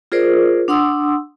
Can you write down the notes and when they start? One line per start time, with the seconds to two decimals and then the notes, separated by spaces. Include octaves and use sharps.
0.12 F4 G#4 A#4 C5 D5
0.68 D4 F#5 C6 D#6 E6